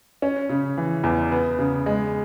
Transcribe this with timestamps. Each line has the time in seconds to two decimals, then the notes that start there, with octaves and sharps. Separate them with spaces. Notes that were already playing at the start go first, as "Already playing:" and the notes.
0.22 C#4
0.50 C#3
0.78 E3
1.04 E2
1.32 B3
1.59 C#3
1.86 G#3